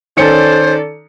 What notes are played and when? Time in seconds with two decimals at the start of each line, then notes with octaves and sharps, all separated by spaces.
0.17 D#3 C#4 A4 C5 D5 C#7